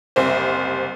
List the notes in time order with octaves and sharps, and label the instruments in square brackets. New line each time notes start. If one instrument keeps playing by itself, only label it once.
[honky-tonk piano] F#1 C2 C5